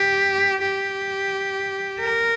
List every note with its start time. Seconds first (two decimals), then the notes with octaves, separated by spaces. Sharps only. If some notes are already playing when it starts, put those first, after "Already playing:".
Already playing: G4
0.61 G4
2.00 A#4